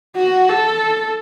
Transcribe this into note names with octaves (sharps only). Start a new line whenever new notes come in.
F#4
A4